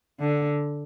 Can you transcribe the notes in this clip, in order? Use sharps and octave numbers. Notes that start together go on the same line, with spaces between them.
D3